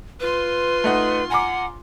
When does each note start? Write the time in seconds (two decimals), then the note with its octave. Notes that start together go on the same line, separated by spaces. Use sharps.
0.20 F4 B4 C6
0.84 A3 D#4 F#5
1.30 F#5 G#5 A#5 D6